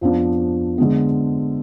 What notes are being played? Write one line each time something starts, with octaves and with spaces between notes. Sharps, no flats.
F2 F3 B3 D4
D3 G#3 B3